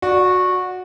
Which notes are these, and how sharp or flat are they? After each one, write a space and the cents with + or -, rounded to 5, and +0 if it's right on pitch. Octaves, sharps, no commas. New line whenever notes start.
F#4 -15 D5 +0